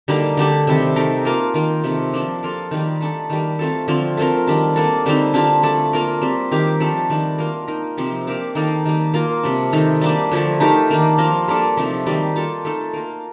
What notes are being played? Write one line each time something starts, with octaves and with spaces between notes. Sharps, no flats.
D3 G3 A#3 D#4
D3 A3 D4 G4
C3 D#3 G3
A3 D#4 A#4
A#3 F4 A#4
D#3 A#3 F4 A#4
C3 D#3 A3
F3 A#3 D4
A#3 F4 A4
D#3 G3 A#3 D#4
A3 D4 A4
D#3 G3 A#3
A3 C4 F4 A4
D3 F3 C4 F4
A3 C4 F4 A#4
D#3 G3 D4
A#3 D4 A4
D3 G3 C4 D#4
D3 G3 D4 F4
A3 D4 A4
A#3 F4 A#4
G3 C4 F4
D#3 A#3 D#4 G4
F3 A3 D4 A4
D#3 G3 D4
A#3 F4 A#4
A#3 D#4 A#4
C3 F3 C4 G4
A#3 D4 G4 A#4
D#3 A#3 D#4 A4
D#3 G3 A#3
A#3 F4 A#4
C3 G3 D4
D#3 A3 D#4
G3 A#3 D4
D3 F3 A3
A3 D#4 G4 A#4
D#3 A#3 D4
F3 A#3 F4 A#4
G3 A#3 D4 A4
C3 F3 A3 D#4
D#3 G3 A#3 D#4
A#3 F4 A4
A3 D#4 A4
A#3 F4 A#4